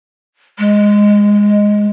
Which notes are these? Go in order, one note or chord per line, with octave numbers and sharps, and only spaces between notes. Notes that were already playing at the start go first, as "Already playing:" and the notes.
G#3